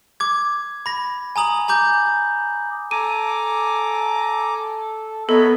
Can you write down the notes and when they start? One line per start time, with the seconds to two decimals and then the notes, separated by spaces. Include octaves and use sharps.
0.20 D6 G#6
0.86 B5 A#6
1.36 G#5 A#5 D#6 F#7
1.68 G#5 A#5 D6 G6
2.91 A4 G#5 A#5 D6 D#7
5.29 B3 A4 A#4 C#5 D#5 E5 B5